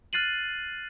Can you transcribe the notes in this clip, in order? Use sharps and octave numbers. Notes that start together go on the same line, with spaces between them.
F6 F#6 A6 C7 D#7 F#7